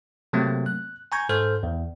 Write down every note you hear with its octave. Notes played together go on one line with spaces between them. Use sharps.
C3 F#3 A3 A#3 C4
F#6
G#5 A#5 C#6 G6 G#6
G#2 A4 C5 F6 G6
E2